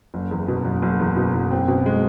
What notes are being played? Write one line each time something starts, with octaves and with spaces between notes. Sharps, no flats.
F#1
E2
B2
F#1
F#1
E2
B2
F#1
C4
B2
G#3